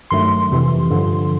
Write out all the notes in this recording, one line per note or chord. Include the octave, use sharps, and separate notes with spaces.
G2 D#3 F#3 A3 C6
F2 C3 E3
G2 D3 F3